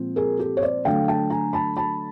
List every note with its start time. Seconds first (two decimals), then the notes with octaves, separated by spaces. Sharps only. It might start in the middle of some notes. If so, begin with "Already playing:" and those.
Already playing: A#2 F3 G#3 C4
0.16 G#4 A#4
0.39 G4 A4
0.57 C#5
0.62 C5 D5
0.85 D3 F#3 A3 D4 F5 G5
1.08 G5 A5
1.30 G#5 A#5
1.53 A5 B5
1.77 A5 B5